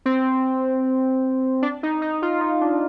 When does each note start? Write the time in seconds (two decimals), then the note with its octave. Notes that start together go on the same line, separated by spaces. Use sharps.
0.06 C4
1.62 D4
1.83 D#4
2.02 D#4
2.22 F4
2.41 D#4
2.61 D4